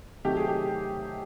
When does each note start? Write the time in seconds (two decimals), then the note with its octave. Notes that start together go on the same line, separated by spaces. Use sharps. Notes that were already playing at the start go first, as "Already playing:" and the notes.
0.25 C3 D#3 F#3 A3 G4
0.37 G#4
0.48 G4